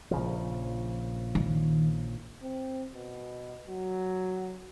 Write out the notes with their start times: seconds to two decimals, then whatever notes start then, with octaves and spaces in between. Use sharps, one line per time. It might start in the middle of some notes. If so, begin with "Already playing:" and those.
0.11 A#1 C#3 F3
1.35 D#3
2.42 C4
2.92 B2
3.67 F#3